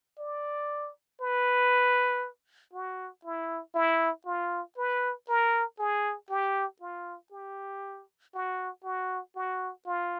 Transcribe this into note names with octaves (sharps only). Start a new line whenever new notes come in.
D5
B4
F#4
E4
E4
F4
B4
A#4
G#4
G4
F4
G4
F#4
F#4
F#4
F4